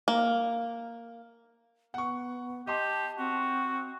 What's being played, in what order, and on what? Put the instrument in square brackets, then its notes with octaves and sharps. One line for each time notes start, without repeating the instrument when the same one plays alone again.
[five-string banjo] A#3
[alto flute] B3 [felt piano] F#5 C#6
[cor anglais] G4 [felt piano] D#5 C6 [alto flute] A5
[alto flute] C4 [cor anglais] F#4